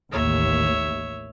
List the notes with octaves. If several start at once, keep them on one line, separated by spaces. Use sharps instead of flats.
A1 D#2 C#5 E5